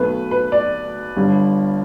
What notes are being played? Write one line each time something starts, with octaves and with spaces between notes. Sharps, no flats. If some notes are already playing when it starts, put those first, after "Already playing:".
Already playing: B1 B2 A3 B4
B4
D5
G1 G2 G3